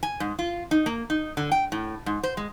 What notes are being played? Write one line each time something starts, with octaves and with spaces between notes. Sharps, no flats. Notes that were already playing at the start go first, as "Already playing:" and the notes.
G#5
G#2
F4
D#4
A#3
D#4
D3
G5
A2
G#2
C5
G#3